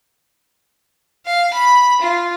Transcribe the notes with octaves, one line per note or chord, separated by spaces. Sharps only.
F5
B5
F4